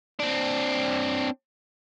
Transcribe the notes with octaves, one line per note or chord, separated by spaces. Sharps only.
C4 D4